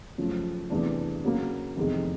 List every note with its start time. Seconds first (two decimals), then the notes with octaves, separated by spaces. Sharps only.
0.18 F#2 C#3 F3 A3
0.70 E2 C3 E3 A3 D4
1.24 C#3 F#3 A#3
1.77 F1 E2 C3 D#3 G#3